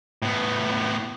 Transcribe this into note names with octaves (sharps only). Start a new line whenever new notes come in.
A2 B3